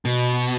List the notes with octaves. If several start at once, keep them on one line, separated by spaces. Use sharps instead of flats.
B2